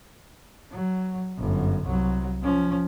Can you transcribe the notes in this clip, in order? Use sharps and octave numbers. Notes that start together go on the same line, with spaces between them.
F#3
G1 F#2
C2 F#3
F3 C#4